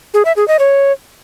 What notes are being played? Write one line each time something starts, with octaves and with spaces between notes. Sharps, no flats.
G#4
E5
G#4
D#5
C#5